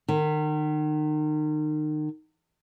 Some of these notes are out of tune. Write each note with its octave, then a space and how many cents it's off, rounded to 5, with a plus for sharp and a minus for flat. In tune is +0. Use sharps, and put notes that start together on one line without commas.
D#3 -35